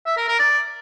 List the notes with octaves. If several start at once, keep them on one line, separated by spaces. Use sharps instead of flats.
E5
A#4
A#4
D5